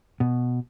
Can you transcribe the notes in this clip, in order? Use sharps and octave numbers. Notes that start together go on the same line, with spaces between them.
B2